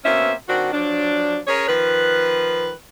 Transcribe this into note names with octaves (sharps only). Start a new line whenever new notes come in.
B2 A#3 C4 C#4 E5
D#3 C4 D4 F#4
F3 F#3 D4
C#4 G#4 A#4 C#5
D#3 F3 B4